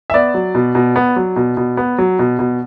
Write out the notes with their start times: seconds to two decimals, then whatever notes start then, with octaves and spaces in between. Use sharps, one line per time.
0.10 E5
0.14 B3 D5
0.34 F#3
0.55 B2
0.75 B2
0.96 B3
1.16 F#3
1.36 B2
1.57 B2
1.77 B3
1.98 F#3
2.19 B2
2.39 B2